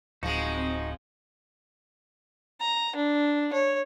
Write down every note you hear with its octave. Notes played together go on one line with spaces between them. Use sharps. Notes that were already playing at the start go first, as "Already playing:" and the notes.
D1 F3 G#3 C4 D#4 F#4
A#5
D4
C#5